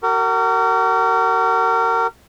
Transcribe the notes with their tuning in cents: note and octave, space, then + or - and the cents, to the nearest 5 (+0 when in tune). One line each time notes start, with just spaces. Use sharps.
F#4 +40 A#4 -30